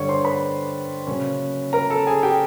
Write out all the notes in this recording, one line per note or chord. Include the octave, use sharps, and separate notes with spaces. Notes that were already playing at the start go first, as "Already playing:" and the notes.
Already playing: G2 D3 G3 C#5 D5 C#6
C5 C6
B4 B5
C#3 F#3 A#3 C#4
A#4 A#5
A4 A5
G#4 G#5
G4 G5